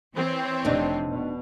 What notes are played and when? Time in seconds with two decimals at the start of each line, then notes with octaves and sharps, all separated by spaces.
0.15 E3 C4 C#5
0.65 F1 C3 D4 D#4
1.09 B2